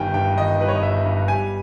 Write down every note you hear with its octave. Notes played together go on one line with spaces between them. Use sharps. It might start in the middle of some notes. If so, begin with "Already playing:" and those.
Already playing: G1 D#3 G3 G5 G#5
G2 G5
D#3 D#5
G3 B4
C#5
D#5
G1 E5
G2
G3 G#5